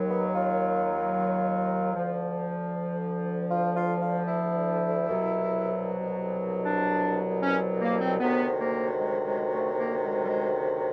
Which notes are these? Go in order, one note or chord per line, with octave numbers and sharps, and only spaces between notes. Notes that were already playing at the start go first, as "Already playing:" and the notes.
Already playing: D#2 D#3 F#3
B3
F4
D2 D3 F3
F4
F4
F4
E4
C2 B2 F#3
D4
C#4
A#3
C4
D2 C3 D#3 F#3 B3
A#3
G#3
G#3
A3
A#3
G#3
G3
G#3